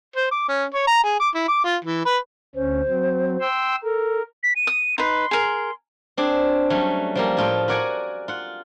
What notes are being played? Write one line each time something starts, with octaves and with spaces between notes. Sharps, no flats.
C5
D6
C#4
C#5
A#5
G#4
D6
E4
D6
F4
E3
B4
D2 C#4 C5
F#3 C4
G5 C6 E6
A4 A#4
B6
D#7
D#6
D#4 B4 C6
G#4 A#4
C4 D4 G#4
F#3 G3 A3 C#4
F3 G3 A#3
A2 F4 A4 G5
F#4 A#4 D5 F#5 G#5
F4 F#5